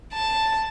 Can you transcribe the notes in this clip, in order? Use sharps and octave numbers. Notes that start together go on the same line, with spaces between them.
A5